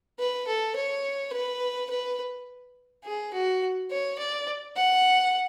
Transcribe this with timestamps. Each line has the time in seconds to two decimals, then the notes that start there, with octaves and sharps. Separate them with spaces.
0.19 B4
0.47 A4
0.76 C#5
1.33 B4
1.90 B4
3.04 G#4
3.34 F#4
3.91 C#5
4.18 D5
4.76 F#5